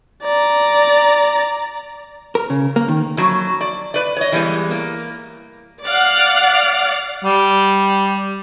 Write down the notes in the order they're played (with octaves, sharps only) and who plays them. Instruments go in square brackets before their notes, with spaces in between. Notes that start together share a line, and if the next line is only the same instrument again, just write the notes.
[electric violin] D5 A#5
[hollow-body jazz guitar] A#4
C#3
A#3
D#3
[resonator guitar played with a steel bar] F2 F#3
D5
B4 D5
C#5 D#5
E3 G3 G#3 A#3 B3
A#3
[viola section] D5 F5 F#5
[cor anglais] G3